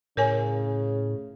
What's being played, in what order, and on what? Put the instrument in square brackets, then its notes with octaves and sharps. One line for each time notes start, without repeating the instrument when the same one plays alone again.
[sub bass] A2 [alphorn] C#3 [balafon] A#4 C#5 G#5